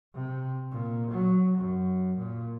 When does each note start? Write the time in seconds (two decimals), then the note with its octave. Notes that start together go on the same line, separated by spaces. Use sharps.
0.15 C3
0.71 A#2
1.11 F#3
1.59 F#2
2.18 A#2